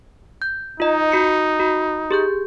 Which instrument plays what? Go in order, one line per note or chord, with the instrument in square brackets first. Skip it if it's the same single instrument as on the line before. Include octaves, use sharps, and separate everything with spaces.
[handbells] G6
[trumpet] D#4 [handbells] F4 D#5
[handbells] F#4 C#7
F#4
G4 G#4 G6